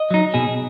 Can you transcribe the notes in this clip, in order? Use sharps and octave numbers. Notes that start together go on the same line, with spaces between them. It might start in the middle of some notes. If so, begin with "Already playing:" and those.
Already playing: D#5
F#3 D#4
B2 G#4